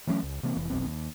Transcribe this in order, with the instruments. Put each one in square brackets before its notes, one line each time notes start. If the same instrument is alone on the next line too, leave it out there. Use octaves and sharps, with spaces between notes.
[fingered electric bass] E3 F#3 A3 C#4
C#2
C3 E3 A#3 C4
F1 E3
F1 B1 E2 C4
D#2